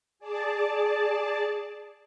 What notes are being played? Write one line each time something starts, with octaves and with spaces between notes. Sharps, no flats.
G#4 D5 A5